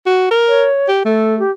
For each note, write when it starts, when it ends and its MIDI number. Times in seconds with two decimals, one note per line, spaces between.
0.06 0.29 66
0.31 0.67 70
0.48 0.88 73
0.88 1.04 67
1.05 1.42 57
1.05 1.38 69
1.39 1.51 67